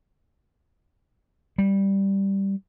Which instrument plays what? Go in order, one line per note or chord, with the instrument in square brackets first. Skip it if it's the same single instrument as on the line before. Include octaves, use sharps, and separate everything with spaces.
[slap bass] G3